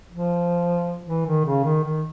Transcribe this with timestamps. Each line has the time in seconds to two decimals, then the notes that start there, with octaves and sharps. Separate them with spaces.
0.12 F3
1.07 E3
1.27 D#3
1.46 C#3
1.65 D#3
1.84 D#3